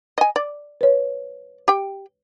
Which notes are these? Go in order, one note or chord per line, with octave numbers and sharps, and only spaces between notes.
D#5 G#5
D5
B4 C#5
G4 G5